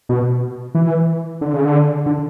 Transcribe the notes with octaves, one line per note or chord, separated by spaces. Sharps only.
B2
E3
D3
C#3
D3
D3